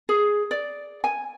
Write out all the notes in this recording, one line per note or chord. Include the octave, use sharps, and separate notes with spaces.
G#4
D5
G#5